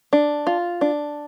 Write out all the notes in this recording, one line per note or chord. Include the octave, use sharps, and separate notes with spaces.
D4
F4
D4